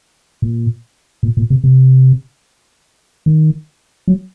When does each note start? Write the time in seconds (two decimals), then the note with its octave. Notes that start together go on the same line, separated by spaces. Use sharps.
0.42 A#2
1.23 A#2
1.37 A#2
1.50 C3
1.64 C3
3.26 D#3
4.08 F#3